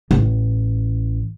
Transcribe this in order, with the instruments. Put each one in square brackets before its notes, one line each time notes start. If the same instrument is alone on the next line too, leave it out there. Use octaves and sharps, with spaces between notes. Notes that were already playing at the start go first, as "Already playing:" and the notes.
[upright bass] A1